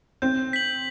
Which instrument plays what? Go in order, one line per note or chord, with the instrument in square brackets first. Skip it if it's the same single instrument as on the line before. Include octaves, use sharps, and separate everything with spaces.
[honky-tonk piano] C4 [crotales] G6
[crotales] B6 F#7